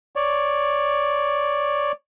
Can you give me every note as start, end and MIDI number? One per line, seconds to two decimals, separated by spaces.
0.16 1.92 73
0.16 1.92 74